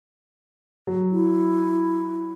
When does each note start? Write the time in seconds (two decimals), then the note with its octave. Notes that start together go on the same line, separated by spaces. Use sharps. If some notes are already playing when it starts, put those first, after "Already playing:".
0.87 F#3
1.12 E4